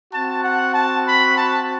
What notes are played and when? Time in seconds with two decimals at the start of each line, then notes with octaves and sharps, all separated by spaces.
0.12 C4 F#4 A5
0.43 F#5
0.73 A5
1.05 B5
1.36 A5